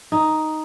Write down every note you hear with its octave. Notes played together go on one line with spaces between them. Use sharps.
D#4